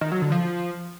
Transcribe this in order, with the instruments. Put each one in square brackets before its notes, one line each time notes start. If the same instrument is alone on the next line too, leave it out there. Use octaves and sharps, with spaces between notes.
[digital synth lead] D#3
F#3
D3
F3